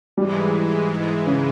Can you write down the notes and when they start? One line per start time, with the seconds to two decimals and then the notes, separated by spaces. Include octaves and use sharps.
0.17 G#2 E3 G3 G#3
0.90 G#2 E3 G#3
1.27 C#3